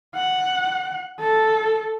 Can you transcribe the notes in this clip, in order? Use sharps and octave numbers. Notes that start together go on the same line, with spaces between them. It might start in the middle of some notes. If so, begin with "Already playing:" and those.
F#5
A4